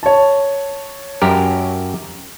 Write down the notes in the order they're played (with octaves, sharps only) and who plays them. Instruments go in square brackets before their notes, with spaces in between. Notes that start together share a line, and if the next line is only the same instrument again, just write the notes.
[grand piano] C#5 A5
[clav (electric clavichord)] F#2 G4 A#4